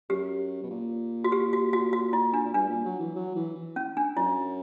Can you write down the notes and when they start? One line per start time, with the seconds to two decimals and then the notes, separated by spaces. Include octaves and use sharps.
0.10 F#2 G4
0.63 B2
0.70 A#2
1.24 F#4
1.32 G4
1.53 F#4
1.73 F#4
1.93 F#4
2.13 E4
2.34 D4
2.45 A#2
2.54 G2 D4
2.69 A#2
2.85 F#3
3.00 E3
3.15 F#3
3.36 E3
3.55 E3
3.76 C#4
3.97 D4
4.17 F#2 E4